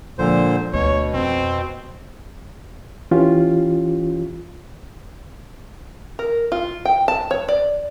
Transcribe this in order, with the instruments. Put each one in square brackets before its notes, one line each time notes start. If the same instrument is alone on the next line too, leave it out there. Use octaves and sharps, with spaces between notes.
[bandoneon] A#2 D3 C5 [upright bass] F3 G#3
[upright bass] D2 [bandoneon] B2 [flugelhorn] C#5
[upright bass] F2 C#4 [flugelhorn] C4
[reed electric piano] E3 C#4 F4 G4
[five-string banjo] A#4
F4
G5
A5
C#5
D5